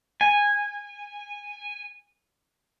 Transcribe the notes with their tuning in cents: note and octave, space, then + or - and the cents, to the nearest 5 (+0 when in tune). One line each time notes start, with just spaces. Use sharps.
G#5 -15